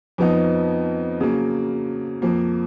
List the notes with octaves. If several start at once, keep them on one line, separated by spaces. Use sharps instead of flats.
F2 F3 B3 D#4
C#3 F#3 A#3
F2 F3 A#3